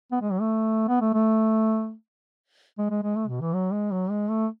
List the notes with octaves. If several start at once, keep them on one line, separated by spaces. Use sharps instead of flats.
B3
G#3
F#3
A3
B3
A3
A3
G#3
G#3
G#3
A3
B2
E3
F#3
G#3
F#3
G#3
A3